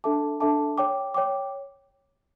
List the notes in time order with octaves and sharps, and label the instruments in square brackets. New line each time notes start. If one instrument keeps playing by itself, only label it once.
[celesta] D4 A4 E5 A5 D6
D4 A4 E5 A5 D6
C#5 G5 D6
C#5 G5 D6